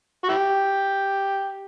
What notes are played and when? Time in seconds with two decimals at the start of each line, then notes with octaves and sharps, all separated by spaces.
0.24 F#4
0.29 E4 G4